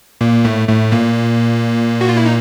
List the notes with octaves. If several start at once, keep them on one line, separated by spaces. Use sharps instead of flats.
A#2 A#3
A2 A3
A2 A3
A#2 A#3
F#4
F4
E4
D#4